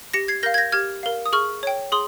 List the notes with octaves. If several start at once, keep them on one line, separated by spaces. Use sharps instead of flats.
G4 A#6 C#7
G#6 C7
A#4 F5 G6 A#6
G#6
G6 A#6
G4 F6 G#6
A#4 F5
D#6
G#4 C#6 F6
C#5 G5
G#4 C6 D#6